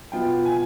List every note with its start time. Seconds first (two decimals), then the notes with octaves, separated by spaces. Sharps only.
0.12 B2 B3 F4 G5
0.45 G#5